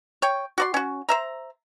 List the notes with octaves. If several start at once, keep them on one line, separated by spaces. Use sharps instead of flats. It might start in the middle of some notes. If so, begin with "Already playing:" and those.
C#5 G5
F#4 D5 C6
C#4 F#4
C5 E5 A#5